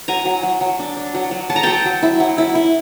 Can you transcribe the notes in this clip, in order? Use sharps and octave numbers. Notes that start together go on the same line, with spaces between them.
F#3 G#5 A#5
F#3
F#3
F#3
D4
D4
F#3
F#3
F#3 A5
A#5
F#3 G5 A5
F#3
E4
F#3
E4
E4